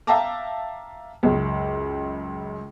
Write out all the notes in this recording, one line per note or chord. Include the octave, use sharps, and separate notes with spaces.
E5 F5 G5 A5 A#5 D6
C#2 F#2